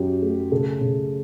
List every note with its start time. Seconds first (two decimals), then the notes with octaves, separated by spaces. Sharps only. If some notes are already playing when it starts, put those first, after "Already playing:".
Already playing: F#2 F#3 G4
0.22 A3
0.51 C#3 A4
0.81 C#3